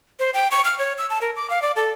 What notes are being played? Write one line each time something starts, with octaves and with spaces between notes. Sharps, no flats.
C5
G5
C#6
F6
C#5
E6
A5
A#4
D6
F5
D5
A4